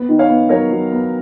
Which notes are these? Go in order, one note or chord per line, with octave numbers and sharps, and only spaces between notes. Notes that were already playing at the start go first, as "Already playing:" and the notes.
Already playing: B3
D#3
C#5 F5
B3
F#3 A#4 C#5
F#3
B3